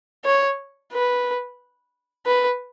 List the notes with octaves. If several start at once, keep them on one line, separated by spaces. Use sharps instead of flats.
C#5
B4
B4